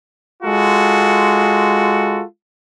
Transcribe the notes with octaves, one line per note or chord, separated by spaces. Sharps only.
G#3 F4 F#4 A4